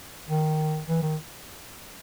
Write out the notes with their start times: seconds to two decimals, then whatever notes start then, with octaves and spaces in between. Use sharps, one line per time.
0.29 D#3
0.87 E3
1.02 D#3